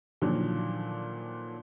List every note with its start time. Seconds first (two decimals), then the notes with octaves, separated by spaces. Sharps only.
0.22 A#2 D3 D#3 F3 F#3